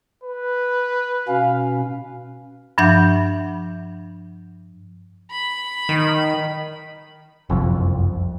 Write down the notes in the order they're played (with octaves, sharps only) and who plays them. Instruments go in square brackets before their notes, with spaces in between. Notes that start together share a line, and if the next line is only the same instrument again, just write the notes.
[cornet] B4
[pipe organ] B2 C#4 [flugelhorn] F5
[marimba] G2 F3 D4 E5 F#5 G6
[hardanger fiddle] B5
[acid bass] D#3
[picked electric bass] F#1 C2 F2